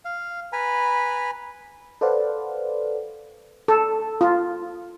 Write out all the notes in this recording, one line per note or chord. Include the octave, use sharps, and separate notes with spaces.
F5
B4 G#5 A#5 B5
A4 B4 C5 D5 F5 F#5
A4
F4